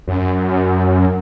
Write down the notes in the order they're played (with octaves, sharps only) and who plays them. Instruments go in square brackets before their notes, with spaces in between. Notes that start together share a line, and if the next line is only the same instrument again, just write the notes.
[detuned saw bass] F#2